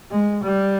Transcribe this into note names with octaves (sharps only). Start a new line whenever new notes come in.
G#3
G3